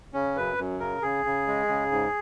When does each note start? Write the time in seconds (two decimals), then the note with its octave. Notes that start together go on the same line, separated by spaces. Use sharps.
0.14 C#3 C#4
0.36 F#2 B4
0.58 F#2
0.80 C#3 A#4
1.02 C#3 G#4
1.25 C#3
1.47 G#3
1.68 C#3
1.91 G#2